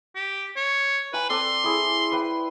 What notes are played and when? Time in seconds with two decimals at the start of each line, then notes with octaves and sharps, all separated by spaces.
0.15 G4
0.56 C#5
1.13 B4 G5 G#5 A#5
1.29 C4 A4 D5 C6
1.64 E4 G#4
2.12 B4 F#5 G5